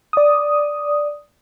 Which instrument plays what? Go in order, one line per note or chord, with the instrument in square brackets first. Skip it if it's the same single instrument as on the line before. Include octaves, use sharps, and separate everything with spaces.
[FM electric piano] D5 D#6